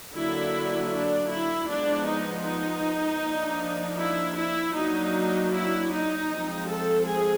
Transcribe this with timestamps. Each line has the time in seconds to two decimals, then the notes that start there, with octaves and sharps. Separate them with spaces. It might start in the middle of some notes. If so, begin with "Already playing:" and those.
0.14 D3 F#3 A#3 D4 E4
0.91 D4
1.29 E4
1.67 F3 G#3 B3 D4
2.06 D#4
2.45 D#4
3.22 F3 A#3 D4
3.99 E4
4.37 E4
4.76 F#3 A#3 D4 D#4
5.53 E4
5.91 D#4
6.30 F3 G#3 C4
6.69 A4
7.07 G#4